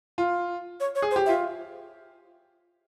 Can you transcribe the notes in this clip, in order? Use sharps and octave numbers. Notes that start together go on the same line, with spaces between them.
F4
C#5
C#5
G#4
C5
G4
F4 E5